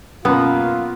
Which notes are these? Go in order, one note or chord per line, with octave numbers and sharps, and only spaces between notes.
F#2 B2 A#3 B3 F4